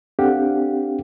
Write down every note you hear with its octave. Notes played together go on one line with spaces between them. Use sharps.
C4 D4 G4 A4 F5 F#5